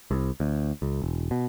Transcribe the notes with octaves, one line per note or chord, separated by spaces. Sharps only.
C2
D2
C#2
E1
B2